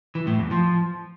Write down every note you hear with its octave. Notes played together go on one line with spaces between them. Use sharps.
E3
A2
E2
F3